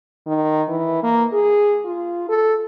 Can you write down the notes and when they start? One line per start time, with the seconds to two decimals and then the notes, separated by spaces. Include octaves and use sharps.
0.27 D#3
0.69 E3
1.03 A#3
1.32 G#4
1.85 F4
2.29 A4